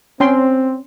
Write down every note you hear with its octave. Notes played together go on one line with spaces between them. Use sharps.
C4 C#4 G5 C6